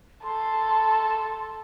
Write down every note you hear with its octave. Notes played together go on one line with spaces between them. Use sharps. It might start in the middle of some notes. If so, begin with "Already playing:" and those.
A4 C6